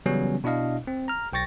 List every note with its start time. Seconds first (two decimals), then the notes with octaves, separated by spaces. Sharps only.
0.06 C#3 E3 F#3 G3 B3 C#4
0.44 B2 D4 E4 D#5 F5
0.87 C4
1.08 A#5 F6
1.33 B1 G5 C#6 A6 A#6